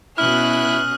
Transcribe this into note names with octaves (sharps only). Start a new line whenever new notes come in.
B2 C#4 E4 D#6 F6 F#6